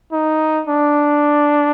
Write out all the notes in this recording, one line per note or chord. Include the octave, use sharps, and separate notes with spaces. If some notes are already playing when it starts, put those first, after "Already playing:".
D#4
D4